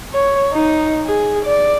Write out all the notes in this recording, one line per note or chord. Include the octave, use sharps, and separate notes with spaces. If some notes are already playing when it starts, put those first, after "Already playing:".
C#5
D#4
G#4
D5